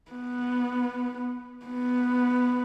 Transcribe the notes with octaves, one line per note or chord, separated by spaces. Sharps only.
B3
B3